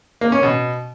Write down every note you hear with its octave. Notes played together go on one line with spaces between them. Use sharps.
A#3
C#4
B2